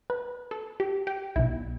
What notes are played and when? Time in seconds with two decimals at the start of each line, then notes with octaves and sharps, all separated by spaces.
0.10 B4
0.51 A4
0.80 G4
1.07 G4
1.36 B1 B2 E4